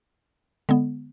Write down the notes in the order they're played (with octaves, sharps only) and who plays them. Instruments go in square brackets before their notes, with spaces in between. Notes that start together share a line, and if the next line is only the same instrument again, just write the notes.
[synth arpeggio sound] D3 G#3 B3